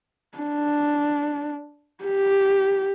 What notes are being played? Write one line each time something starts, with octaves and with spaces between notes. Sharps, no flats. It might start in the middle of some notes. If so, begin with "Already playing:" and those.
D4
G4